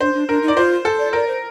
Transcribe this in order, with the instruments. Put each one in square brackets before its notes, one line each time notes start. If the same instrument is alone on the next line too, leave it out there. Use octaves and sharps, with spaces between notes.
[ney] D4 [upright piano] C5
[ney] D4
[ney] D4 [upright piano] A#4
[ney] D#4
[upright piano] D5
[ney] F4 [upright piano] C5
[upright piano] A4
[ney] D5
[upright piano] A#4 [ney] D5
[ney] C5